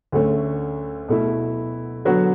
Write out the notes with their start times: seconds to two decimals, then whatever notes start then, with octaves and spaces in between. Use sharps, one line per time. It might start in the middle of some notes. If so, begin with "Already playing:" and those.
0.12 D2 D3 A3 C#4
1.09 B2 A3 E4
2.05 D3 F#3 B3 F#4